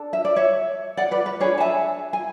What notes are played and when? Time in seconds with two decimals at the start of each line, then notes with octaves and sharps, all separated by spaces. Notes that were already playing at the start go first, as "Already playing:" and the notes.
Already playing: D4 A4
0.13 E5
0.25 D5
0.36 C#5 E5
0.97 D5 F#5
1.11 B4 D5
1.26 B4
1.40 D4 G#4 B4 C#5
1.58 A5
1.60 E5 G#5
2.13 G#5